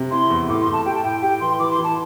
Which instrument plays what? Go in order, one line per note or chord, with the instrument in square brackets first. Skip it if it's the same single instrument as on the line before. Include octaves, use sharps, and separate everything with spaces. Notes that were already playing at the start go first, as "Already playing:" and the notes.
Already playing: [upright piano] C3
[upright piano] E4 [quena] C6
[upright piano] E2
[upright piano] A2 [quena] D6
[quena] C6
[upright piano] A2
[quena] A5
[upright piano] G4 [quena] G5
[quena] A5
[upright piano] A2 [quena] G5
[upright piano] G4 [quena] G5
[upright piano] E3 [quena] C6
[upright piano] E3 [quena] D6
[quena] C6
[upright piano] E3
[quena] A5